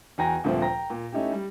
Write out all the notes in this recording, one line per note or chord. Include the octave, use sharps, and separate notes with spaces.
E2 F#4 G5 G#5 A#5 A#6
D2 G2 A#2 F3 A3 C4
G5 A#5 A#6
A#2
A3 C#4 D#4 E4 G4
G3